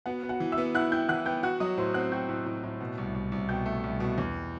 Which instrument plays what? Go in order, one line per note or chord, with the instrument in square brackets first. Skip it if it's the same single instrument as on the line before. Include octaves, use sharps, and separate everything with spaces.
[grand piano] B3 [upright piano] F#4 F#5
[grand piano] B3
[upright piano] F#4 F#5
[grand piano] E3
[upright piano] E5 E6
[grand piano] B3
[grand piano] E4 [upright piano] F#5 F#6
[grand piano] E4 [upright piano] G5 G6
[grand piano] E3 [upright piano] F#5 F#6
[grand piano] B3 [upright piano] G5 G6
[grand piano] F#4 [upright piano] F#5 F#6
[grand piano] F#3 [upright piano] D#5 D#6
[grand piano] A2 [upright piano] C5 C6
[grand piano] C4 [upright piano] F#5 F#6
[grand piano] F#4 [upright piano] G5 G6
[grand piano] A2
A2
A2
B2
C2
C2
C2
[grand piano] B2 [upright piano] G5 G6
[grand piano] A3
C2
B2
E2